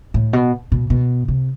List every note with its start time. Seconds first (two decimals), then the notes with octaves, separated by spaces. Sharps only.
0.14 A2
0.33 B2
0.72 B2
0.90 B2
1.28 C3